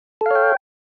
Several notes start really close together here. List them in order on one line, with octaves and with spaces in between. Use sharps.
A4 F5 C#5 G5